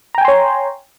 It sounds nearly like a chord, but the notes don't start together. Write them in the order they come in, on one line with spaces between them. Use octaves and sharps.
A#5 G5 G#5 C6 C#5